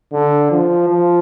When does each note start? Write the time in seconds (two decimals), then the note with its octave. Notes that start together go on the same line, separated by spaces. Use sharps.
0.13 D3
0.51 F3
0.90 F3